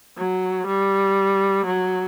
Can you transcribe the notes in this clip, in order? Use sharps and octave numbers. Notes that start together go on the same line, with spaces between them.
F#3
G3
F#3